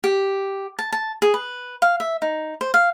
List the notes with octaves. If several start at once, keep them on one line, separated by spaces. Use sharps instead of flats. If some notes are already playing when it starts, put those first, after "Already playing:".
G4
A5
A5
G#4
B4
F5
E5
D#4
C5
F5